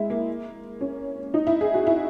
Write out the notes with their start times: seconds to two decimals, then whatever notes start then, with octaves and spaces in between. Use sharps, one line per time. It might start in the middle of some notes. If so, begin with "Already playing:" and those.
Already playing: G#3 E4
0.10 A#3
0.81 C#4
1.34 D#4
1.47 E4
1.61 G#4
1.74 F#4
1.87 E4